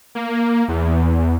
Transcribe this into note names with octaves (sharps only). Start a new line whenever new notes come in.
A#3
E2